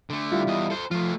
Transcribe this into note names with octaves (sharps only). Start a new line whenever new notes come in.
D3 A3
G3 E4 F4
E2 D#5
A4 C5
F3 A3 F4